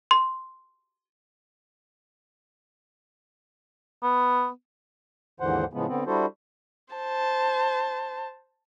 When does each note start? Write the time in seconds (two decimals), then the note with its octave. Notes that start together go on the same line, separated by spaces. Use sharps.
0.11 C6
4.03 B3
5.40 D#2 G#2 D3 E3 C5 F#5
5.73 A2 C#3 F3 G#3 B3
5.87 D3 B3 C4
6.07 G3 D4 E4 F#4 A4 C5
6.94 C5 A5